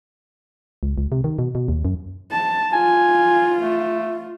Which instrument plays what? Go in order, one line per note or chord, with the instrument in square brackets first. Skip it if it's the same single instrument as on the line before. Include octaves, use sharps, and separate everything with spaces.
[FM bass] C#2
C#2
C3
D#3
B2
B2
D#2
F#2
[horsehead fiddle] A5
[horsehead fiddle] F4 [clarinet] G#5
[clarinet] A3